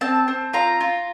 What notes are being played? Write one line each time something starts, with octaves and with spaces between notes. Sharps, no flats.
C4 A5
C4
F4 A#5
F4